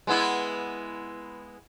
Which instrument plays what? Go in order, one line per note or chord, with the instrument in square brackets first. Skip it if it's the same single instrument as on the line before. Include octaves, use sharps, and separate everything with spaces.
[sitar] G#3 B3 E4